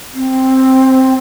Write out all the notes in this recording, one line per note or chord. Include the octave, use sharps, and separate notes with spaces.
C4